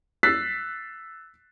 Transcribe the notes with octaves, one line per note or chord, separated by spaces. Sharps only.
E6 F#6 A6 B6 C7